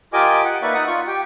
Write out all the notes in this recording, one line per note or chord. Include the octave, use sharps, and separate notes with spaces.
F4 G4 A#4 D#5 G#5 D6
F#5
A#3 D#4 B4 D5 E5 C#6
D#4 F#5 D#6
F4 C#6
G4 G5